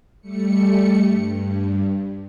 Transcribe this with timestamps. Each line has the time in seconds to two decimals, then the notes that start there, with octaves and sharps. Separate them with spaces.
0.21 G3 A3 C#7
1.05 G2